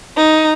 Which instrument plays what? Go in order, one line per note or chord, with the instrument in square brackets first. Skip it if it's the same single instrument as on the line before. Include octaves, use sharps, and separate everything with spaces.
[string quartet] D#4